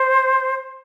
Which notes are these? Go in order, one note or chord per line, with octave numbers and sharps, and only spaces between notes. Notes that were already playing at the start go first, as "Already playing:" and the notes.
Already playing: C5